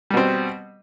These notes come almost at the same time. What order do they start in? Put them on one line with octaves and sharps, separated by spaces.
G3 B2 C4